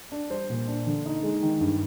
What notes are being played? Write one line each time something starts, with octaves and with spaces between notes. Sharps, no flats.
D4
G3 C5
A#2
D4
D3
D#4
G#3
D#3
G2